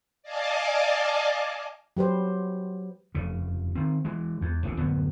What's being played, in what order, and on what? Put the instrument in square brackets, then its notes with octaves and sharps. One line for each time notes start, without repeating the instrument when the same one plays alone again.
[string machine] D5 D#5 F5 G#5 A5 D6
[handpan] F#3 G4 B4 C5
[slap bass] F1 C#3
D#3 C4
E3 G#3
E2
F1 A#1 C3
D1 F#2 B3